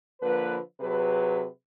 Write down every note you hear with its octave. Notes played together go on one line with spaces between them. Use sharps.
D3 F3 A#3 B4
C3 F#3 G#4 B4